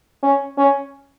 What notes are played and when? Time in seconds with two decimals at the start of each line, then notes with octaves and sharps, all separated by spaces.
0.23 C#4
0.58 C#4